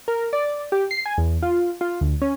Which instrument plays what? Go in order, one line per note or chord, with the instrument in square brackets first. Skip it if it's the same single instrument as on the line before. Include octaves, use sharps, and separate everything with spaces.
[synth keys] A#4
D5
G4
C7
G#5
E2
F4
F4
D2
C#4